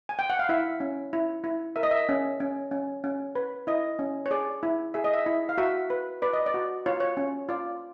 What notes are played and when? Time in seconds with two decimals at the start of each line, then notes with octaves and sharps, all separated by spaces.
0.09 G#5
0.19 G5
0.30 F#5
0.39 F5
0.49 E4 E5
0.80 C#4
1.13 E4
1.44 E4
1.76 A#4 E5
1.83 D#5
1.91 E5
2.09 C#4
2.40 C#4
2.71 C#4
3.04 C#4
3.35 B4
3.67 E4 D#5
3.99 C#4
4.26 C#5
4.31 G#4 D5
4.63 E4
4.94 G#4 E5
5.04 D#5
5.13 E5
5.26 E4
5.49 F5
5.58 F#4 E5
5.90 B4
6.22 B4 D5
6.33 D#5
6.46 D5
6.54 F#4
6.86 F4 C#5
7.00 C#5
7.17 C#4
7.49 F4 D5